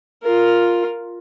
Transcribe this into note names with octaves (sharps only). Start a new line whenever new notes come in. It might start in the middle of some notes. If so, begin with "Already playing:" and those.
F4 A#4